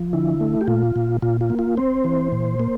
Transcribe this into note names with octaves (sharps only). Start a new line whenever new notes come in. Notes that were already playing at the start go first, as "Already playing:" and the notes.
Already playing: F3
D3 E4
A3
G4
A#2 F4
A#2
A#2 F4
F4
A#3
F4
C4 C5
E3
A#2
A#3